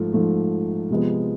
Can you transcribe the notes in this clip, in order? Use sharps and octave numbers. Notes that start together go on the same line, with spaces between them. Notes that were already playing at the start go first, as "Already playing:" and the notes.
Already playing: G#2 F3 A3
G#2 F3 A3
C3 F3 G#3 B3